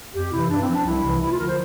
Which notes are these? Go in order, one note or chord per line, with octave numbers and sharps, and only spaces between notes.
F2 G4
C3 E3 E4
G2 D4
C4
F3
D4
C2 E4
C3 E3
D2 E4
F4
D3 F3 A#4
C5